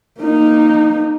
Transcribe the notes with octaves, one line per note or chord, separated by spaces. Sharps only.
A#3 D#4